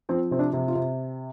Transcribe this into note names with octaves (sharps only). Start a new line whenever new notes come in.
F3 C4
C3 C4
D4
C3
F4
C3